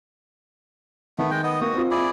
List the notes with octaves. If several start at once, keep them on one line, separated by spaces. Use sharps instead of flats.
D#3 A3 B3
G#3 G5
B3 D#5
A#3 F#4 D#6
C4 F4
E4 G#4 D5